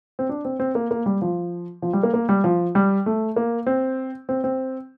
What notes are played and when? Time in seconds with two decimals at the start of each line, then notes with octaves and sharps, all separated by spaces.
0.19 C4
0.29 D4
0.45 C4
0.60 C4
0.75 A#3
0.91 A#3
1.06 G3
1.22 F3
1.82 F3
1.93 G3
2.03 A#3
2.14 A#3
2.29 G3
2.44 F3
2.75 G3
3.06 A3
3.36 A#3
3.66 C4
4.29 C4
4.44 C4